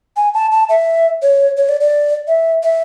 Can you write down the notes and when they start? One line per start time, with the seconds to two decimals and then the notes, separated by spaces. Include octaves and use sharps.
0.17 G#5
0.34 A5
0.52 A5
0.69 E5
1.22 C#5
1.57 C#5
1.69 D5
1.81 D5
2.27 E5
2.63 E5